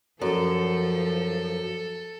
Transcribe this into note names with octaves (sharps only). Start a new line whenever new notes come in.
F#2 F3 A4